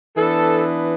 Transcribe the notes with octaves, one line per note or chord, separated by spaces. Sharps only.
E3 B3 D4 A4